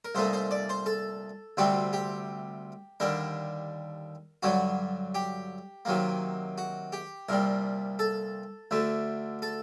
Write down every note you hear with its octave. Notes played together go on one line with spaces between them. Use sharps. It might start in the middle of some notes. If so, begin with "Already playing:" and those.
A#4
C2 A#2 A3 D#4 C5
C5
D5
C5
A4
D2 C3 G3 C4 F#4
G4
D#2 D3 G3 D4 A#4
G2 D3 F#3 F#4
G4
C3 D#3 F#3 A#3
F#4
G4
C2 A#2 G3 A#4
A4
D2 D3 A3
A4